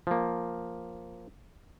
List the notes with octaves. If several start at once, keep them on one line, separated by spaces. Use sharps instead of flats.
F3 A#3